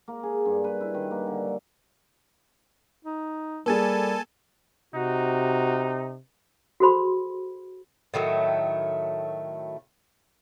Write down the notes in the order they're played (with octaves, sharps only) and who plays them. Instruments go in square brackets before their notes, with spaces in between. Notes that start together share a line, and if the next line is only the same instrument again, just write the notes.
[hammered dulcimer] A#3
G#4
G2
B4
E4
D#3
A#3
D3
F#3
[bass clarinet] D#4
[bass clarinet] G3 [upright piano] A#3 G#4 [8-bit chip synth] A4 G#5 A5
[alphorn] C3 [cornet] D#4 [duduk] F#4
[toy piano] F#4 G#4 A4 C5 B5 C6
[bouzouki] A2 D#3 F#3 A3